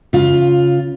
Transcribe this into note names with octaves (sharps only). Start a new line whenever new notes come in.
C#3 F4